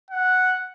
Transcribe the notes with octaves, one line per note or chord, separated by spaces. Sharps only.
F#5